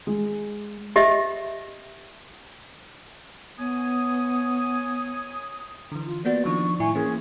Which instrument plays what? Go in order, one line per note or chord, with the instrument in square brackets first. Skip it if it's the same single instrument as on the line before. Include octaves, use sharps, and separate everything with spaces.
[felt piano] G#3
[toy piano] G4 D#5 E5
[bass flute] B3 [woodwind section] C#5 G#5 D#6
[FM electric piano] D3 E3
[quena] F4
[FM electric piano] A#3 B3 F#4 [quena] D5
[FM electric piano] D#3 F3 D4 [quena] C#6
[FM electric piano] A2 E4 C#6 [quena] G#5
[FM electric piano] E3 A#3 C#4 [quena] G#4